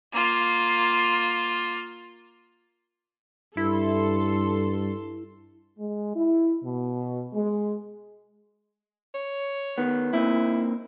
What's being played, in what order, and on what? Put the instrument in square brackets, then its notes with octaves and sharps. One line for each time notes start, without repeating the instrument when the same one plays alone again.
[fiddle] A#3 F4
[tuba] G2 [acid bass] E4 [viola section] A4 C6
[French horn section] G#3
E4
B2
G#3
[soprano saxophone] C#5
[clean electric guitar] D#3 B3
[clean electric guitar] A#3 C4 D#4 [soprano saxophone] E4